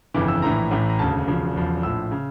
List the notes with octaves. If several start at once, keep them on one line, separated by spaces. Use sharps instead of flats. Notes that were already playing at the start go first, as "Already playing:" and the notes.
G1 F2 C#3 E3 D6
E6
A#1 A2 E3 A#5
A1 A2 E3
A#5
E1 D2 C#3 A5
E1 E2 C#3 F3
E1 E2 C#3 F3
A#1 A2 F3 E6
C#3